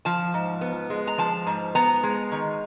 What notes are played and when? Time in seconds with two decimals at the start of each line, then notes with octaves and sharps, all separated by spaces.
0.05 F3 A5
0.34 G#2
0.61 B3
0.90 G#3
1.07 A#5
1.18 F3 A5
1.47 G#2
1.75 B3 A#5
2.03 G#3
2.31 D#3